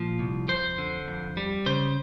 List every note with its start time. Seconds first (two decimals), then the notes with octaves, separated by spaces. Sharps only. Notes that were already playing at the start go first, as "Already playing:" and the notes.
Already playing: A#2 F3
0.19 C2
0.49 F2 C5
0.78 D3
1.08 F2
1.37 G3
1.66 C#3 C5